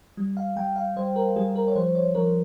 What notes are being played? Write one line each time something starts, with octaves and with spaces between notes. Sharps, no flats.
G3
F5
G3 G5
F5
G3 C5
A#4
G3 G#4
A#4
C#5
F3 C5
C#5
F3 A#4